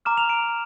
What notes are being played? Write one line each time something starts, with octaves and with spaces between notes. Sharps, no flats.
A#5 D6 F6 E7
F7
D7